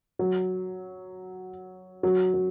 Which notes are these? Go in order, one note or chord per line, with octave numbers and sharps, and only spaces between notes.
F#3
F#3
F#3